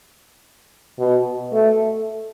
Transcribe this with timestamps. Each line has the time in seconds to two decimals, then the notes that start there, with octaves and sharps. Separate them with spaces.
0.99 B2
1.53 A3